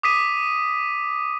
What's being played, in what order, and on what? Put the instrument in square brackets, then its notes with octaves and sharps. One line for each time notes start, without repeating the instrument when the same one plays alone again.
[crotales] D6 D#6 B6 D#7